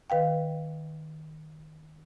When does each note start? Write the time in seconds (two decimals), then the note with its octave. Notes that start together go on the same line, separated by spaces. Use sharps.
0.10 D#3 B4 F5 G5